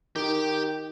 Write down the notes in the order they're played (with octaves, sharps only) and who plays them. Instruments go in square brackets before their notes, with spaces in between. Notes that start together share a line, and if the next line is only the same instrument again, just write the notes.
[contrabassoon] D#3 [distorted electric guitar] G4 G5